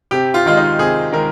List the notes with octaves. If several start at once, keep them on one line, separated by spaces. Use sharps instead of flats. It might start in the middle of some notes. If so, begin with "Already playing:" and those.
C3 G4
F4
D#3 G#3 F4
D#4
C3 G#4
D#3 G#3 A#4